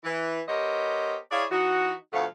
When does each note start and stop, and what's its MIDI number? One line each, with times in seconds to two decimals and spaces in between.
0.04 0.41 52
0.48 1.16 59
0.48 1.16 67
0.48 1.16 70
0.48 1.16 72
0.48 1.16 73
0.48 1.16 75
1.31 1.44 64
1.31 1.44 68
1.31 1.44 73
1.31 1.44 74
1.31 1.44 77
1.51 1.93 52
1.51 1.93 63
1.51 1.93 66
2.13 2.25 38
2.13 2.25 47
2.13 2.25 53
2.13 2.25 57
2.13 2.25 77
2.13 2.25 78